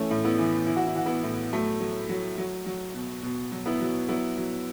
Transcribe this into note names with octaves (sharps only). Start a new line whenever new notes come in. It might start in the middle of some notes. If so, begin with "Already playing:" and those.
Already playing: E3 A3 C#4
A2
B3 E4
E3
E3 E4
F#4
E4
E3 F#4
B3 E4
A2
F#3 A3
F#3
F#3
F#3
F#3
B2
B2
F#3
B3 E4
F#3
F#3 B3 E4
F#3